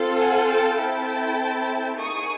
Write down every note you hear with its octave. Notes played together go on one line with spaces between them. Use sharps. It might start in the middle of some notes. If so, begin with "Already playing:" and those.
Already playing: C4 F4 A4
F#5 G#5
G5 A5
C4 E4 A4 G5 A5
A#3 D#4 G#4 C#6 D#6